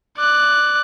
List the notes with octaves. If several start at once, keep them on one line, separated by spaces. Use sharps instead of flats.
D5 F#6